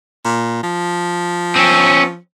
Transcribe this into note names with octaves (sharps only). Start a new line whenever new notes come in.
A#2
F3
C4 C#4